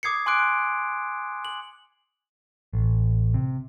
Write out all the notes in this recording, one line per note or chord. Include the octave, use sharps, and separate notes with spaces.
D6 D#6 G#6 C7 C#7
G#5 C6 D6 F#6 D7
F#7
A1
C3